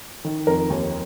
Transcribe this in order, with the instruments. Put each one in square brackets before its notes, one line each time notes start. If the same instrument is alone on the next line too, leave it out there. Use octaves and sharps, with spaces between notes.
[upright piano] D#3
F2 A#4
D#2